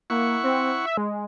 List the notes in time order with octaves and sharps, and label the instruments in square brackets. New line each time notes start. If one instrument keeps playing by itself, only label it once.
[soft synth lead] A#3 [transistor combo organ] E4 F#5 C#6
[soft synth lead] C4
E5
G#3